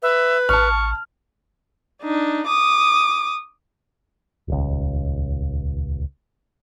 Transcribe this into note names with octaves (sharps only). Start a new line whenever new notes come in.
B4 E5
A1 A5 C#6 F6
D4 D#4
D6 D#6
D#1 C#2